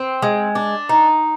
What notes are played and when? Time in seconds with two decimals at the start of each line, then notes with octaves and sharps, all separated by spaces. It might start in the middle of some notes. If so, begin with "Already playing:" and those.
Already playing: C4
0.22 G#3
0.55 D4
0.89 D#4